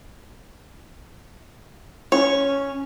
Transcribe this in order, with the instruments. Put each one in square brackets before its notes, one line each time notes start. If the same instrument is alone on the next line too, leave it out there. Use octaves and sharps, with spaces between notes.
[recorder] C#4 [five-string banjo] C#5